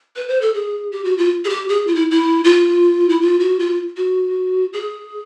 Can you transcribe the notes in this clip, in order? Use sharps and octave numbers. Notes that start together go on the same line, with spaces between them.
B4
C5
A4
G#4
G4
F#4
F4
G#4
G4
G#4
F4
E4
E4
F4
E4
F4
F#4
F4
F#4
G#4